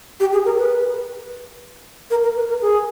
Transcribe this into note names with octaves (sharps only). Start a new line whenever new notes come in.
G4
G#4
A#4
B4
A#4
A#4
B4
A#4
G#4